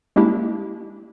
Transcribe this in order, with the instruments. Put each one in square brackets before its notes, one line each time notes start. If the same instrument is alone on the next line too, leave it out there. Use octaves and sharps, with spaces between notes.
[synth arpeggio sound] G#3 A#3 C#4 D4 E4 G4